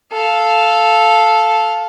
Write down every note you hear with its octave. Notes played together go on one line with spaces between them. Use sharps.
A4 F5